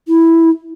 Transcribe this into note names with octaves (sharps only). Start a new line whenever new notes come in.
E4